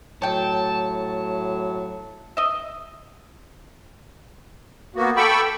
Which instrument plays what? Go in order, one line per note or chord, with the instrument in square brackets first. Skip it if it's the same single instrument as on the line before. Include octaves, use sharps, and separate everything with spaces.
[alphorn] A2 [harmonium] F#3 [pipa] C#5 G5 [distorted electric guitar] A5
[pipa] D#5 E5
[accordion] A#3 B3 F#4
A4 G5 B5 C#6 D6 E6